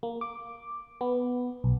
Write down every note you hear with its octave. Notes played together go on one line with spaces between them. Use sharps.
A#3
D6
B3
B1